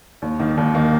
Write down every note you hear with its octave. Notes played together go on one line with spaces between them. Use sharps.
D#2
D#3 A#3
D#2
D#3 A#3